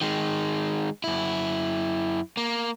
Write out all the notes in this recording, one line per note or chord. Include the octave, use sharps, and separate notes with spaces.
D#3 G#3
F#2 E4
A#3